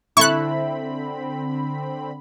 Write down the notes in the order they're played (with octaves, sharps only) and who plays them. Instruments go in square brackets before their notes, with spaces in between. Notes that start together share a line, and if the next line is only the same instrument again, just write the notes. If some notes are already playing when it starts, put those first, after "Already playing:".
[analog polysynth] D3 C4 B5 [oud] E4 A4 [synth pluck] C#6 F#6